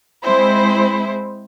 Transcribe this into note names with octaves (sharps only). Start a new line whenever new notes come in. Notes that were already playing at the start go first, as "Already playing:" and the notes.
G#3 C4 E4 C5